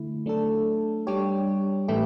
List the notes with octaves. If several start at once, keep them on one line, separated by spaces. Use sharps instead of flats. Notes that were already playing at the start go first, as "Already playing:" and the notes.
Already playing: D3 A3 E4
F#3 A3 D4 A4
G3 D4 G4 C#5
A2 E3 A3 E4 G4